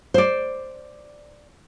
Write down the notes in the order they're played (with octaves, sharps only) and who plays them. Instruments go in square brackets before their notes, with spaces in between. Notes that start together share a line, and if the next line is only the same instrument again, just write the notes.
[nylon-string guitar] C5 D5